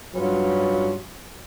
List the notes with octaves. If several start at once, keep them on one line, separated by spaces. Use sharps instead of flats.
G2 F#3 C#4 F4 B4